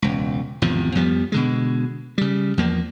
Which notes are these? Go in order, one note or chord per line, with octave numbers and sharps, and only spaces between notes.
E1 C#2
G#1 E2 C3 F3
F2 F3 G3 B3
B2 D3 G#3
C#3 G3
E2 F3 A#3